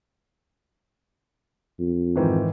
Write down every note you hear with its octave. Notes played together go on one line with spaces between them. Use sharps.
F2
G#2 D#3 E3